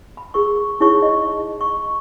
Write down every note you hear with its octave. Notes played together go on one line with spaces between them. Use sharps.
B5
G#4 A#4 C#6
D#4 E4 G#4 C#5 C#6
D#5
C#6